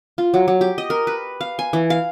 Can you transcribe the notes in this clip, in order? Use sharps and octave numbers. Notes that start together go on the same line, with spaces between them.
F4
F#3
F#3
G4
D#5
A#4
B4
F5
G#5
E3
F5